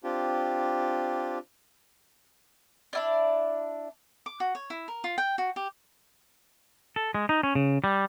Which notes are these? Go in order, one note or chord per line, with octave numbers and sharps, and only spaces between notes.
C4 D4 F4 G4
D4 E4 D5
D6
F#4
C#5
E4
A#4
F4
G5
F#4
G4
A4
G#3
D#4
C#4
C#3
G3